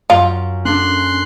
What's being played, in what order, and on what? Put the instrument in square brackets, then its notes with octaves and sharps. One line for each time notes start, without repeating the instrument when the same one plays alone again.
[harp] F#2 [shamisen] F4
[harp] A#3 D4 A4 [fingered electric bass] C#4 [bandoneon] C6 F#6